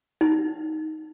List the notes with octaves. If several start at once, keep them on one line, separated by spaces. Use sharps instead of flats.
D#4